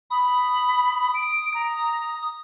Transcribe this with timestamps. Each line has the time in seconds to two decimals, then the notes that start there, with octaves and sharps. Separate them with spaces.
0.11 B5 D#6
1.14 D7
1.54 A#5